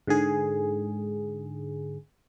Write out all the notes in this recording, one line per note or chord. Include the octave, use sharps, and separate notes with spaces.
G#2 D3 G#4